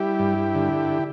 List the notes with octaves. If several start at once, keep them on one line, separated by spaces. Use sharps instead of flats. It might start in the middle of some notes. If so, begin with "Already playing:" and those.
Already playing: G3 E4 G4
G2
D3